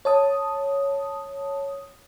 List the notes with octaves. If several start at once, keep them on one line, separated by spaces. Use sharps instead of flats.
C#5 A5 D#6